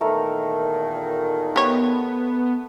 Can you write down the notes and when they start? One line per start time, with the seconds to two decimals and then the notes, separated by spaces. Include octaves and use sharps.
0.01 E2 A#2 D#3 A3 A#4
1.56 B3 G4 C#5